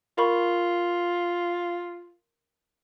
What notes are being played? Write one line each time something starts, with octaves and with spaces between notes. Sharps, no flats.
F4 A#4 B5 C#6